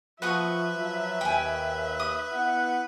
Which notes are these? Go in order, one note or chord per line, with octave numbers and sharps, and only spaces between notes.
F3 F#4 B4 E5 C#6 D#6
F3 F#3
D#2 G5 G#5
D#6
B3 E4 F#5